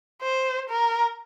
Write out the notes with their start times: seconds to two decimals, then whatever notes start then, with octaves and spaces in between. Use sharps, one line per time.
0.22 C5
0.69 A#4